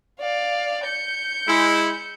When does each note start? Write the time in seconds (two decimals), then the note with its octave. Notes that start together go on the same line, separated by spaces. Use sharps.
0.20 D5 F5
0.85 G6 C#7
1.48 G#3 E4